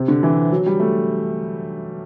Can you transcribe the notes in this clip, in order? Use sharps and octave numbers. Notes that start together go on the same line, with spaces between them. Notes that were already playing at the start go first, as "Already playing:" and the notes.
Already playing: C3
D3
E3
F#3
G3
A3